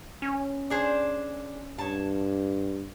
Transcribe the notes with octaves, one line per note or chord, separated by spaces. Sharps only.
C#4
D4 G#4 C5
G2 C#5 A5